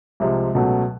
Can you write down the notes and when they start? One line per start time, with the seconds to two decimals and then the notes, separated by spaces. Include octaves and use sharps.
0.20 C2 C3 F3 G#3 C4
0.54 C#2 B2 F#3 A3